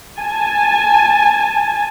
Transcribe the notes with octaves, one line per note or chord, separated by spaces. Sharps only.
G#5 A5